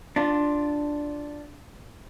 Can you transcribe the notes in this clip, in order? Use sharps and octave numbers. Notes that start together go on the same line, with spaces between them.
D4 F4